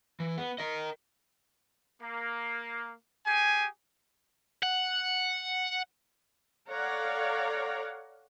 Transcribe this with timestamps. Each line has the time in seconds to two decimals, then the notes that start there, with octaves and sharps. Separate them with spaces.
0.20 E3
0.37 B3
0.58 A#4 D#5
2.01 A#3
3.26 G4 G#4 G#5
4.63 F#5
6.68 A4 C#5 D5 F5 F#5 A#5